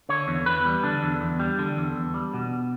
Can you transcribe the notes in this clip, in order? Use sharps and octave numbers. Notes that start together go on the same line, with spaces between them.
D3 C#5
E2
E2 B4
G3
D3 D4
E2
E2
G3
D3
E2
E2
G3
B2